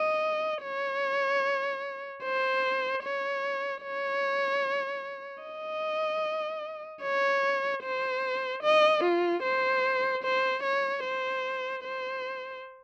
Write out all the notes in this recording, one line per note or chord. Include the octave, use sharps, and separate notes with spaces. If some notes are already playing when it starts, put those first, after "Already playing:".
Already playing: D#5
C#5
C5
C#5
C#5
D#5
C#5
C5
D#5
F4
C5
C5
C#5
C5
C5